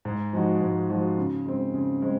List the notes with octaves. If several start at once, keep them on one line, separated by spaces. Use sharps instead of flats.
G#2
F3 G#3 D#4 F#4
G#2
F3 G#3 D#4 F#4
C#3
G#3 C4
C#3
G#3 C4